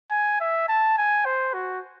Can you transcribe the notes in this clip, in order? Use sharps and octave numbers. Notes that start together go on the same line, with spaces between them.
G#5
E5
A5
G#5
C5
F#4